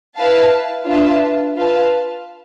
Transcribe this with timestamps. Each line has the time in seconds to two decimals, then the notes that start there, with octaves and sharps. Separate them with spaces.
0.15 E4 B4 F5 A5
0.85 D4 F4 B4 E5 A5
1.56 F4 B4 F5 A5